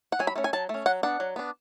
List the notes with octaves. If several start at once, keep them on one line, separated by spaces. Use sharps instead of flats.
F#5
F#3 G#5
B5
A3 C#4
G#5
F#3 A5
A3 C#4
F#3 F#5
B3 D4 F#5
F#3
B3 D4